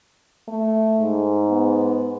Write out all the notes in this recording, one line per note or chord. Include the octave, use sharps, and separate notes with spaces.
A3
G#2
B3